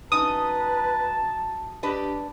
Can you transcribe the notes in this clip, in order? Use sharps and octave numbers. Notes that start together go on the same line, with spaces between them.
F#2 D#4 B4 A5 D#6
D4 G4 B4 D#5